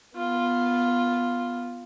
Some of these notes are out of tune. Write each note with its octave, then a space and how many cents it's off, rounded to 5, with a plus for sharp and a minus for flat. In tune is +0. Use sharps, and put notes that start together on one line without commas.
B3 -5 F4 +0